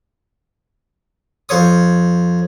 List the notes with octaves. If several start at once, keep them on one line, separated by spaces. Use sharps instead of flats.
F2 C5 C#5 D#6